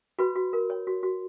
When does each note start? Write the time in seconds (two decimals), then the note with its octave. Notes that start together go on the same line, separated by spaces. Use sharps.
0.19 F#4 B4 B5
0.36 F#4
0.53 A#4
0.70 C#5
0.87 F#4
1.03 F#4